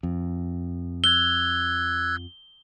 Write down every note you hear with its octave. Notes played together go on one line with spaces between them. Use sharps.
F2
E6 F#6 G#6 G7